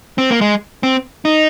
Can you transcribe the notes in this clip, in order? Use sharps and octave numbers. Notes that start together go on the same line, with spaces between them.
C4
A#3
G#3
C4
D#4